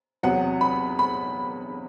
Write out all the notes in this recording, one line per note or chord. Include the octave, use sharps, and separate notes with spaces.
E2 C3 F#3 B3 F#5
B5
B5